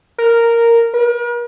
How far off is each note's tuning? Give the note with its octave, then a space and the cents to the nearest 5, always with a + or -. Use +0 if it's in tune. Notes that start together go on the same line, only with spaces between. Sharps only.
A#4 -5
A#4 +45